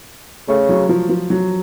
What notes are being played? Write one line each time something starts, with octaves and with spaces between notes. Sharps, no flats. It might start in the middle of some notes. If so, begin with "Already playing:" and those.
C#3 A3
F#3
F3
F3
F#3